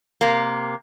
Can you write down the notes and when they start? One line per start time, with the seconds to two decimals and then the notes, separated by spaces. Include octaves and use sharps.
0.21 C3 A#3